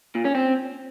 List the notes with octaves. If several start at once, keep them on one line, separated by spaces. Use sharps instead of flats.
A#2
C#4
C4